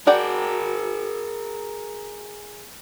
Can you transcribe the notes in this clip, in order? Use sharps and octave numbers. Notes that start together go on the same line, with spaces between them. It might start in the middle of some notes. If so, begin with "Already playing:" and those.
F#4 G#4 A#4 D5 G5